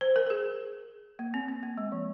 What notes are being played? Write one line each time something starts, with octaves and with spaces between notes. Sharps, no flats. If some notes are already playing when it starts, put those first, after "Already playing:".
C5
A#4
A#4
G#4
A#3
C4
C4
A#3
G#3
F3